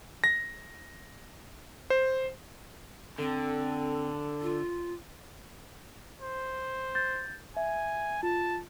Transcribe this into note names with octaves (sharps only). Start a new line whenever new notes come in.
A#6
C5
D3 C4 A4
F4
C5
G6 A6
E5 G#5
F4 A5